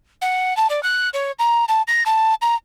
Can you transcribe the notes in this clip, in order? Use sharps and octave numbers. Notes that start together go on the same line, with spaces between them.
F#5
A5
D5
F#6
C#5
A#5
A5
A#6
A5
A#5